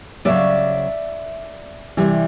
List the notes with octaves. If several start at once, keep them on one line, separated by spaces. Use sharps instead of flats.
C#3 F#3 B3 D5 E5
C3 E3 G3